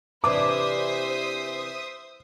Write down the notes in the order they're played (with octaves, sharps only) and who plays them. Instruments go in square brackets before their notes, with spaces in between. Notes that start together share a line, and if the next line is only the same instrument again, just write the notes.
[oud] C3 E3 D4 [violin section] C5 E5 D#6 [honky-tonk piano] D6